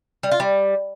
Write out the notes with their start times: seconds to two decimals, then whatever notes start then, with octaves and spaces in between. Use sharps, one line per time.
0.23 G3
0.32 F4
0.40 G3